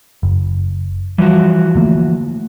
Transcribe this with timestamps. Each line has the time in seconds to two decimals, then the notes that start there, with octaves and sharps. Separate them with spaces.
0.23 F#1
1.18 E3 F3 G3 F#4
1.75 D3 A3 A#3